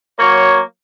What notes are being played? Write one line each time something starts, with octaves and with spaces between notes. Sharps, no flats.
F#3 A#3 C#5